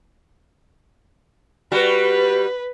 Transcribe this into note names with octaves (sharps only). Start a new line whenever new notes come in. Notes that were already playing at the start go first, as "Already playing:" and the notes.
G3 F#4 B4